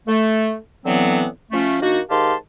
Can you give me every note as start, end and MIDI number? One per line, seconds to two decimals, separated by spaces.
0.07 0.55 57
0.84 1.25 45
0.84 1.25 50
0.84 1.25 52
0.84 1.25 54
0.84 1.25 59
0.84 1.25 60
1.52 1.76 53
1.52 1.76 57
1.52 1.76 61
1.81 1.98 51
1.81 1.98 58
1.81 1.98 62
1.81 1.98 66
2.08 2.33 44
2.08 2.33 51
2.08 2.33 67
2.08 2.33 77
2.08 2.33 81
2.08 2.33 84